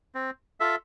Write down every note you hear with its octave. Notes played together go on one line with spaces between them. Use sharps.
C4
F4 A4 E5